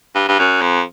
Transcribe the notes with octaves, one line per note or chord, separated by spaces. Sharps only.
G2
G2
F#2
F2